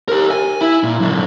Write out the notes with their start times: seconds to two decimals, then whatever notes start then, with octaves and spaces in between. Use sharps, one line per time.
0.08 G4 A#4
0.31 G#5
0.61 E4
0.83 A#2
1.00 F#2 D3